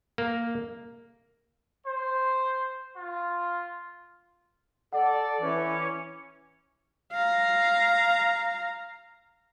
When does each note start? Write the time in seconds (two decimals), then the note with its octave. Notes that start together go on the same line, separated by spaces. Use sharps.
0.18 A#3
1.86 C5
2.97 F4
4.93 A4 D5 F#5
5.41 E3 C#4 D6
7.13 F5 A#5